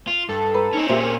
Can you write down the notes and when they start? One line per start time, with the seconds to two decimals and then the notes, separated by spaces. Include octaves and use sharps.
0.07 F4
0.29 G2 A4
0.54 B4 A#5
0.73 C4 C#4 D#4
0.89 A#2 G4 G#4 C5 E5
1.02 A#4